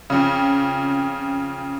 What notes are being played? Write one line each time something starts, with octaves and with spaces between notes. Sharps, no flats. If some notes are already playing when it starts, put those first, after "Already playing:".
F2 C#3